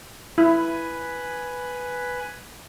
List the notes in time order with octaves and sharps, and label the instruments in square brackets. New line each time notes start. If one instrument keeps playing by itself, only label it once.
[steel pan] E4 [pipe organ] B4 G#5 B5